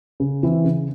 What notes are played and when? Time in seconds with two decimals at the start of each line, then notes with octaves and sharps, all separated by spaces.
0.20 C#3
0.43 E3 C4 E4
0.64 C#3